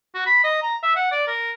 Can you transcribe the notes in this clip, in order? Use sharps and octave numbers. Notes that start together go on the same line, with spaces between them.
F#4
B5
D#5
A#5
E5
F#5
D5
A#4